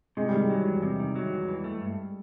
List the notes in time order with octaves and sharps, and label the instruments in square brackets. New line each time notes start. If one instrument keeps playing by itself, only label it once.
[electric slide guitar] C3 [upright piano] G#3
[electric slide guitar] D#3 [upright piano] G3
[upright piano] G#3
[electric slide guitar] F#3
E2
C3
D#3
F#3
E2
E3
A3
G2